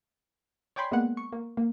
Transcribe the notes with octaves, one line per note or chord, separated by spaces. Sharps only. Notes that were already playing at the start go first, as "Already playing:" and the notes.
C#5 D5 G5 G#5 B5 C6
G#3 A#3 B3 F#5
C#6
A#3
A#3